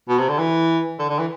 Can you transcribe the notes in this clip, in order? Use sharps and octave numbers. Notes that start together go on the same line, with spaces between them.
B2
C3
D3
E3
D3
D3
E3